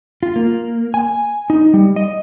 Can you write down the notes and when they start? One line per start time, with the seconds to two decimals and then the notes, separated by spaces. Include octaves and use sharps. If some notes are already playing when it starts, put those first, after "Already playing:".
0.23 F4
0.36 A#3
0.94 G#5
1.50 D#4
1.74 G3
1.96 D#5